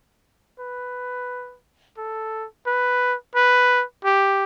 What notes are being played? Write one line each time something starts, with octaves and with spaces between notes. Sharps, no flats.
B4
A4
B4
B4
G4